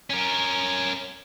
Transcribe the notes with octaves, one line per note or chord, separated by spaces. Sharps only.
C#4 A#4